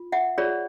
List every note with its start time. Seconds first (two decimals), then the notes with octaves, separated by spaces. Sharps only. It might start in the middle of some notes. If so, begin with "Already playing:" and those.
Already playing: F4
0.12 E5 F#5
0.38 F4 G#4 C#5 D5